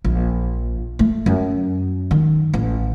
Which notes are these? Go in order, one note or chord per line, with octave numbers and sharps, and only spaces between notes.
A#1
A3
F#2
D#3
A1